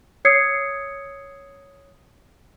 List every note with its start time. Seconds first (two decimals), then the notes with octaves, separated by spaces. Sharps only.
0.25 C#5 D#6 E6 G#6 C7 C#7